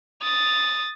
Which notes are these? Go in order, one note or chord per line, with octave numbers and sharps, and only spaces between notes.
D#6 A6